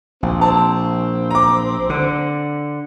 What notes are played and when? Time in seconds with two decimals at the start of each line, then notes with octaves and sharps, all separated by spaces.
0.23 A#1 C4
0.41 C4 A5
1.30 A#5 D6
1.90 D3